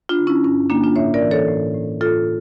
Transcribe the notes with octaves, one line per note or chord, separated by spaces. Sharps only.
D4 F4
D3
C#4 E4
G2 C#4
D3 A#3 D4
D4 F4
A2 C#5 E5
A#4 D5
E3
A4 C#5
A2
A2
A2 F4 A4